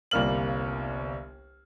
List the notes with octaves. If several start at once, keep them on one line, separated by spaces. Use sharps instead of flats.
G1 C2 G3 A#3 F6 F#7